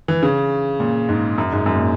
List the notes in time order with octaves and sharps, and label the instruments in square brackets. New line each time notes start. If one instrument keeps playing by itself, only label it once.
[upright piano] E3
C#3
A#2
G#2
F#2
G#2
F#2
A#2